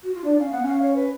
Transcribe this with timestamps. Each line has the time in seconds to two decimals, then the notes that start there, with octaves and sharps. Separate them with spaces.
0.03 F#4
0.14 F4
0.24 D4 D5
0.39 C#4 F5
0.50 B3 F#5
0.62 C#4
0.67 F5
0.82 C#5
0.95 B4